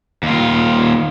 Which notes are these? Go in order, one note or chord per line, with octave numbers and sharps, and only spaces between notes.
D#2 F4